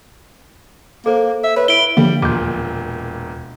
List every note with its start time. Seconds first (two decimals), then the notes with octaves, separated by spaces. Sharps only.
1.06 A#3 A4 C5
1.44 E5
1.56 B4 C#5
1.68 E4 D7 G7
1.97 D3 F3 G3 A#3
2.22 E1 A#2 D6 G6